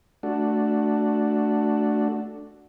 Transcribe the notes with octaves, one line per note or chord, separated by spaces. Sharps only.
A3 D4 F#4